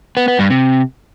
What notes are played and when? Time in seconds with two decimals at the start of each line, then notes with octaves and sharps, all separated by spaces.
0.17 B3
0.28 B3
0.39 G2
0.50 C3